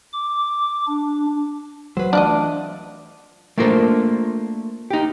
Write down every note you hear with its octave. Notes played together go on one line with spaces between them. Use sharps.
D6
D4
F#3 B4 C5
E3 A3 D4 F4 F#4 D5 D#5
A3 A#3 D4 F4 A#4 C5
D#4 G4